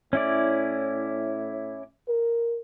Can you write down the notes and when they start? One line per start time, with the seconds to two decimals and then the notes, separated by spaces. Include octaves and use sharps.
0.13 A2 C#4 E4 D5
2.08 A#4